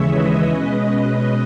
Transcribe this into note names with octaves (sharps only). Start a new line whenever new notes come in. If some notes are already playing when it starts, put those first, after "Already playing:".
Already playing: D#2 C#3 E3 G#3 C#5 E5
B4 D#5
B2 G#3 C#4 B4 D#5